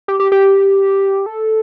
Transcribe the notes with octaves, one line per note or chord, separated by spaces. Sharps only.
G4
G4
G4
A4